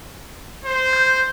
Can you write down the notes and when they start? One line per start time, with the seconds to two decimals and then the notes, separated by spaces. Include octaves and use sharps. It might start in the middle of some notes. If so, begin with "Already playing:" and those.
0.65 C5
0.93 G6